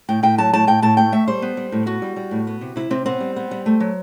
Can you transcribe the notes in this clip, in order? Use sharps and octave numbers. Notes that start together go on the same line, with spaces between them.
A2 G5
A2 G5
F#3 A5
A2 A5
A2 G5
A2 A5
A3 G5
A3 E5
G3 C5
B3
G3
A2
B3 F#4
G3
G3
A2
B3
C3
C3 E4
C3 C4
B3 C4
G3
B3
G3
A3
F#3